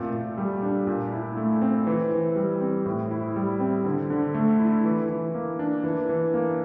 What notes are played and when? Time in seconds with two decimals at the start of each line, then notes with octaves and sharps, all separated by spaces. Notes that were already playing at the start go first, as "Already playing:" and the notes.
Already playing: A#2 A3 C4
0.13 A#2
0.38 G3
0.63 D4
0.87 A#2
1.12 E4
1.37 A3
1.62 C4
1.87 E3
2.12 E3
2.36 G3
2.61 C4
2.86 A2
3.11 E4
3.36 G3
3.60 C4
3.85 D3
4.10 D3
4.34 A3
4.60 E4
4.85 E3
5.09 E3
5.34 A#3
5.59 D4
5.84 E3
6.09 E3
6.34 A#3